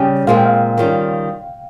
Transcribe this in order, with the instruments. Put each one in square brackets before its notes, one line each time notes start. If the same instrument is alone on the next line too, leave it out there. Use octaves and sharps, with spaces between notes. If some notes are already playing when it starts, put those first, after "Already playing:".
Already playing: [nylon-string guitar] C#3 G3 C#4 G4 [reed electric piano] G5
[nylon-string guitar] A#2 G#3 C4 [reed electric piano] F5
[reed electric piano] G5
F5
[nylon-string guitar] D#3 G3 C#4 F4